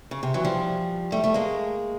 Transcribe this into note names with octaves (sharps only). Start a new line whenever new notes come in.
C#3
C3
E3 F#3
F3 G3
G3 A3
G3 A3
G#3 A#3